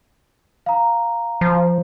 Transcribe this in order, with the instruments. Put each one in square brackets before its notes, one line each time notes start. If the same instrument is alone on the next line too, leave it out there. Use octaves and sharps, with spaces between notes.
[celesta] F5 A#5
[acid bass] F3